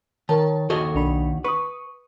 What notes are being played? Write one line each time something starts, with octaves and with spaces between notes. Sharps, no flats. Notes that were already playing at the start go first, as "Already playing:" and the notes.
D#3 A#4 C#5 A5
D#2 F#4 A4 D#5
B1 D4 B5
B4 C#6 D#6